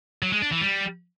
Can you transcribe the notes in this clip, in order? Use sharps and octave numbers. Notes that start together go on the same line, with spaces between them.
F#3
G#3
D4
E3
G3